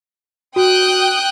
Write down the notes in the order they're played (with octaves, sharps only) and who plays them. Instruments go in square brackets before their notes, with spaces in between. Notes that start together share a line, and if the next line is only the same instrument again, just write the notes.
[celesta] F#4 [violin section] G5 D#6 F#6